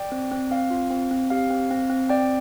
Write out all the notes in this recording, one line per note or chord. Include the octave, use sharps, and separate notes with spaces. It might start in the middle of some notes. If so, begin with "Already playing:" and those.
Already playing: D5 G5
C4
C4
C4 F5
F4
C4
C4
G4 F5
C4
C4
C4
C4 D5 G5